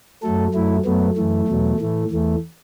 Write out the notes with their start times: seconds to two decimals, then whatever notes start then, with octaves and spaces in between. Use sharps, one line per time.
0.23 F#2 F#3 A3 A4
0.54 F#2 F#3 A3 E4
0.85 F#2 F#3 A3 B3
1.16 F#2 E3 A3
1.48 E2 B2 F#3
1.80 A2 E3 A3
2.11 E2 E3 A3